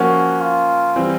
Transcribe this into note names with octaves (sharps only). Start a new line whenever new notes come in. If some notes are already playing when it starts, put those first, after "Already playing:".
Already playing: F3 A#3 C#4 F#4
F4
E3 G3 C4